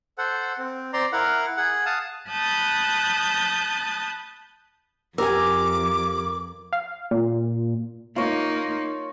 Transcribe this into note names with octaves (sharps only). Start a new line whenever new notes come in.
A4 C5 F#5
C4
C4 D5 A#5 C6
E4 A#4 F5 F#5
G#4 F#5
F5 A5 D#6
A5 B5 D#6 F#6 G6 A6
F2 G4 A#4 G#5 A#5 D6 E6
F5
A#2
A#3 D#4 F4 C#5